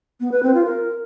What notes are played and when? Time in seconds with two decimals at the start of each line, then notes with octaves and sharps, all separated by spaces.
0.20 B3
0.32 B4
0.43 C4
0.54 F4
0.66 A#4